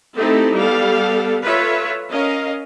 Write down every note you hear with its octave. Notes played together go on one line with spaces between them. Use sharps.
A3 C4 D#4 E4 G4 A4
G3 B3 A4 F5
F4 A4 B4 C#5 E5
C#4 A#4 D#5 F5